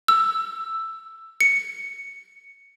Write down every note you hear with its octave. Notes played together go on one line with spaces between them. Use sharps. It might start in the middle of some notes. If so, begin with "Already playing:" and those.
E6
C#7